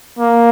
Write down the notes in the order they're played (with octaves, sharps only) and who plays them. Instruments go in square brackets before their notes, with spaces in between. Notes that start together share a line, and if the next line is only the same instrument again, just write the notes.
[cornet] A#3